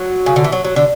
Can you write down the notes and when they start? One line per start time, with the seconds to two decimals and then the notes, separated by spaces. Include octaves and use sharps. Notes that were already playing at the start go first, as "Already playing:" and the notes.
Already playing: F#3
0.26 C#3
0.36 D3
0.44 E3
0.52 F#3
0.65 F#3
0.76 D3